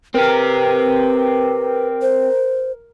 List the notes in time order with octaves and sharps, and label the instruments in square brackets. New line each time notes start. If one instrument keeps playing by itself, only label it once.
[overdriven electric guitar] C4 G4 [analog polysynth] A#4 [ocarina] B4
[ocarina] C5